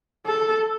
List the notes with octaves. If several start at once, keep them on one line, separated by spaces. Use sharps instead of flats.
A4